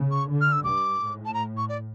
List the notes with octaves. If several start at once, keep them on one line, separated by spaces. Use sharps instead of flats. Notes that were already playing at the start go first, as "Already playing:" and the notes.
Already playing: C#3
C#6
D3
F6
E6
G2 D6
A2
A5
A#5
C#6
D5